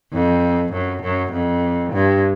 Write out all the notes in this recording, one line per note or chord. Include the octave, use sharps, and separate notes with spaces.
F2
F#2
F#2
F2
G2